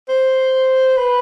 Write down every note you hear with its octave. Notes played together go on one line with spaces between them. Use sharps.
C5
B4